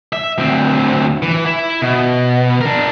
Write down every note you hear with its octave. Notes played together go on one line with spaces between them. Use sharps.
E5
D2 C4
E3
E4
B2
D4 A#4